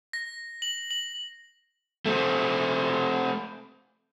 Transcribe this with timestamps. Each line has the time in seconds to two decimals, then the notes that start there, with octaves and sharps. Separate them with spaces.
0.13 A#6
0.62 F#7
0.91 F#7
2.06 A3 C4